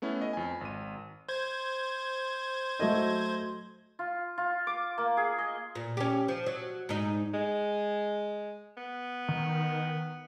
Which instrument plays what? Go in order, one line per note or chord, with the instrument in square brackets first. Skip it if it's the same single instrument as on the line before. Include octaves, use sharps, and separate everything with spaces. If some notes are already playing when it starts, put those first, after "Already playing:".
[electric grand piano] A3 B3 C#4 E4
D#5
F2 G#5
G#1 D#7
[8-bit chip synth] C5 G#6
[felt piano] F#3 A3 D#5
[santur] F4
F4
D6
A#3
G#4
D#5
[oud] A#2
C#4 G4
F3
F#3
G#2 D#4
[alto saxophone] G#3
B3
[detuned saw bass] D#3